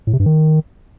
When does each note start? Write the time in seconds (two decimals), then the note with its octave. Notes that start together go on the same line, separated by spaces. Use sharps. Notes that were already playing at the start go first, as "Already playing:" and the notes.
0.07 A2
0.13 C3
0.20 G2
0.26 D#3